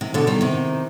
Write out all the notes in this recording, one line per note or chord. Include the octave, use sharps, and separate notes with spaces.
C3 D#3
B2 D3
D#3 G3
C3 D#3